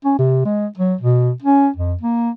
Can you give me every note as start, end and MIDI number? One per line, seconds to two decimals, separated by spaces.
0.05 0.18 61
0.19 0.40 48
0.45 0.67 56
0.77 0.95 54
1.01 1.31 47
1.42 1.69 61
1.76 1.94 41
2.01 2.30 58